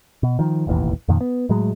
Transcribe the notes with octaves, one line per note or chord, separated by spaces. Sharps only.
B2
D#3 F3
E1 A1 D#2 E3
F2 A#2 D#3
B3
A2 F#3 G#3